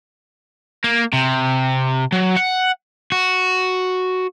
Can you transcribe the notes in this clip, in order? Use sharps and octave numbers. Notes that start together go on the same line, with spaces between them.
A#3
C3
F#3
F#5
F#4